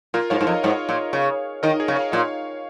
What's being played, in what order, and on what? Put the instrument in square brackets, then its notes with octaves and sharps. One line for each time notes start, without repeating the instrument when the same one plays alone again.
[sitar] A#2 [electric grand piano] F4 A#4
[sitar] G#2 [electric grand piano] C#5 F5
[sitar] G#2
[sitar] F2 [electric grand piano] A#4 D#5
[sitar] G#2 [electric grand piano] C#5 F5
[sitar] A#2
C#3
[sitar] D#3 [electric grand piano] A#4 D#5
[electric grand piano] G#4 C#5
[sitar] C#3
[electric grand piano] C#5 F5
[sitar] A#2 [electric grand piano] C#5 F5